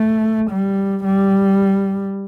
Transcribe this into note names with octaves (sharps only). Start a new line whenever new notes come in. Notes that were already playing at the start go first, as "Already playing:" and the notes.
Already playing: A3
G3
G3